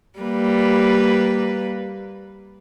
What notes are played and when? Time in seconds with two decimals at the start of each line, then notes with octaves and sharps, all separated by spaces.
0.19 G3 A#3 B4